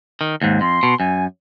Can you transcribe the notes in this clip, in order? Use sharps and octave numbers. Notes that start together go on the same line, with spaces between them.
D#3
D#2 G#2
F2 C6
B2
F#2 G#5